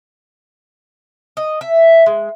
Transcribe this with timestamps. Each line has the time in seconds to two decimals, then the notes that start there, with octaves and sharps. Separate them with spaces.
1.37 D#5
1.61 E5
2.06 G#3